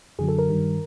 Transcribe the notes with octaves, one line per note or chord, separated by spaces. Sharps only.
F#2 D3 F#3 G#4
A4
A#4
G2 D#3 G3